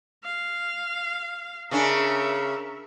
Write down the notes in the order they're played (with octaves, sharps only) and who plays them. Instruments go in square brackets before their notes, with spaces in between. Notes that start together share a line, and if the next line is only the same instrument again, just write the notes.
[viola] F5
[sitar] C#3 C#4 D4 [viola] A#4 E5